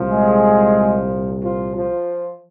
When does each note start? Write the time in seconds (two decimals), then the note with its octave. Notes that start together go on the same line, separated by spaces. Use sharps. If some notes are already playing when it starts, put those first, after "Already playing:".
Already playing: C2 A#2 F3
0.10 G#3 G#4
1.42 F3 F4
1.75 F3 F4